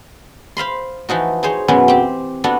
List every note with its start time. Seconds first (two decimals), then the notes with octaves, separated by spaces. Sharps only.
0.57 C5 F5 B5 C6
1.09 E3 F3 D#4 F#4
1.43 D#4 G#4 C5 C#5
1.68 F#2 B2 E3 F#3 G#3 B3
1.88 C4 G4
2.44 B3 D4 F#4 A4